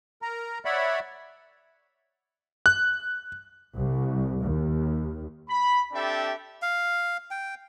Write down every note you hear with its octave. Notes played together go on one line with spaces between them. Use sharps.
A#4 A#5
C#5 D5 E5 F#5 B5
F#6
C2
D#2
B5
C4 D4 G4 A4 E5
F5
G5